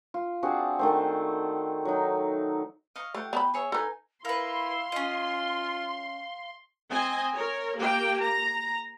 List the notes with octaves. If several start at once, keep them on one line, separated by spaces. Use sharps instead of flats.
F4
C4 D4 F#4 G#4
D#3 A3 C4
F#3 D#4
D#5 F5 C#6
A3 F4 G4 F#5
B3 A5 B5
G#4 C#5 E5
D#4 A4 B4 G#5
E4 A#4 B4 F5 C6
C#4 F4 D#5
C4 D#5 G#5
A#4 C#5
A#3 G4 G5
A#5